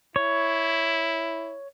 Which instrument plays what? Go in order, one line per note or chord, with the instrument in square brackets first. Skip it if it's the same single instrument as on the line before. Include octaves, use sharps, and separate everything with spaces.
[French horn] E4 [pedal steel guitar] C#5